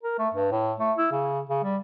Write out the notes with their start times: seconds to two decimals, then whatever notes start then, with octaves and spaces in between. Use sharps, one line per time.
0.03 A#4
0.18 A3
0.34 G2
0.51 A2
0.79 A3
0.97 E4
1.11 C#3
1.49 C#3
1.63 G3